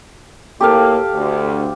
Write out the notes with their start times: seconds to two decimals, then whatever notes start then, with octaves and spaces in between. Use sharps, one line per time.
0.61 A2 A#3 G4 A4 F5
1.13 D2